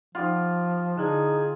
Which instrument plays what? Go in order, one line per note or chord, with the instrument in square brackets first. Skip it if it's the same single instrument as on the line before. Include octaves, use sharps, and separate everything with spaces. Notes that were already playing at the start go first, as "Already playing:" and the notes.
[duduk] F3 [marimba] D#4 F#5 [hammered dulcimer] F4 G4
[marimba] D3 E4 A5 [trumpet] D#4 [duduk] G#4